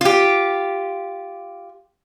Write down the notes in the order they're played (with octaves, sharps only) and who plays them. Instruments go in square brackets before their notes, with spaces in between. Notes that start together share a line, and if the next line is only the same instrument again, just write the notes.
[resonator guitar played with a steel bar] F4 G4